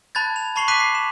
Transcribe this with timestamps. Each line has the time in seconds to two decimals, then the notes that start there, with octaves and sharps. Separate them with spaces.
0.15 A5 B5 F#6 G#6 A6
0.36 F7
0.56 A5 B5 C#6 C7 F7 F#7
0.68 D6 F#6 B6 C7 D#7
0.80 C7
0.95 E7